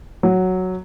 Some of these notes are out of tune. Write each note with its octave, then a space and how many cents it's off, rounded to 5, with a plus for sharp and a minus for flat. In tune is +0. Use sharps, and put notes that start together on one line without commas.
F#3 +0